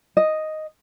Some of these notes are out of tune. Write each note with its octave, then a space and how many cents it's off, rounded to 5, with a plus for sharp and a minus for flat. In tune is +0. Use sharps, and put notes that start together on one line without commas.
D#5 +0